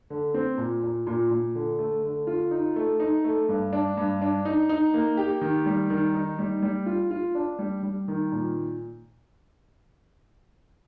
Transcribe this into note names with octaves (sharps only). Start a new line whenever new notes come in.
D3
C4
A#2
A#2
A#2
A#2
D3
A3
D3
F4
D#4
A3
D#4
A3
G2
D4
G2
D4
D#4
D#4
A#3
G4
D#3
G3
D#3
D#4
G3
G3
F4
F4
D4
G3
G3
D#3
A#2